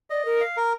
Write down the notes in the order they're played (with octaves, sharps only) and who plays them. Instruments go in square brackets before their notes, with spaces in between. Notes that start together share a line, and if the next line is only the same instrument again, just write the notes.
[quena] D5 [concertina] D#5
[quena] A#4
[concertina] F5
A#4